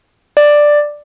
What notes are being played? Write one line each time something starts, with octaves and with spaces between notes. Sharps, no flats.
D5